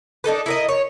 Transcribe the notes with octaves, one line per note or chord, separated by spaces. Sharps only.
D4 D#4 A4 B4
E4 A#4 D#5
C#5